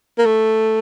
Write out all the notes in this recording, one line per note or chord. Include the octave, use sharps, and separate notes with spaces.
A#3
A3